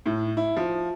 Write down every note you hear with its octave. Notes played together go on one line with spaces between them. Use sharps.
A2
E4
F3